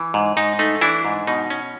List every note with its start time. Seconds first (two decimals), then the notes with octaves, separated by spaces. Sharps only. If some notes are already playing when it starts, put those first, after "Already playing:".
Already playing: E3
0.14 G#2
0.37 G#2 D#4
0.59 A3 D#4
0.81 E3 D4 E4
1.05 G#2
1.27 B2 D#4
1.50 C#4